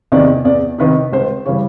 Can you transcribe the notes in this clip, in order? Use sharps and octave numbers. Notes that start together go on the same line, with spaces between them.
E2 C3 D#3 D5
E2 D5
C3 D#3 B4
C#2 C5
C#3 E3 G3 C#5